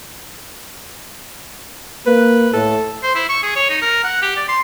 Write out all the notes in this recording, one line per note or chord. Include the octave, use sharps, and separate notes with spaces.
A#3 B4
A2 A4
C5
E4
C#6
G#4
C#5
D#4
A#4
F#5
G4
D5
C6